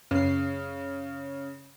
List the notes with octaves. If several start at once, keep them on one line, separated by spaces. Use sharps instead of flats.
F#2 C#3 C7